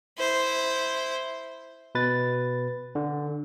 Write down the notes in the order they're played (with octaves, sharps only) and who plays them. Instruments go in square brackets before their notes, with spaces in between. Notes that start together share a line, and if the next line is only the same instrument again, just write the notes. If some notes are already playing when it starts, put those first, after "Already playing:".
[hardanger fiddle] E4 C5
[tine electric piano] B2 B4 A6
D3